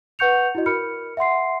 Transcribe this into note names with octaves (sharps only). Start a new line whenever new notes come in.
B4 F#5 C#6 G6 C#7 F7
E4 F#4 D#5
A#4 B5 F6 C#7
E5 F#5 C6 C7